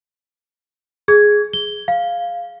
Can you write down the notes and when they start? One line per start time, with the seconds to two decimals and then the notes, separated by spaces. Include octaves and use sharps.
1.08 G#4 G#6
1.53 G7
1.88 F5